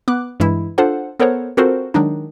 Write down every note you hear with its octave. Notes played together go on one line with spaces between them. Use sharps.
B3 D6 F#6
G2 E3 G#3 E4
D4 F4 A4 C5 F#5
B3 A4 A#4 C5 C#5 F#5
C4 F4 F#4 A4 A#4 C5
D#3 F#3 G#3 D4 D#4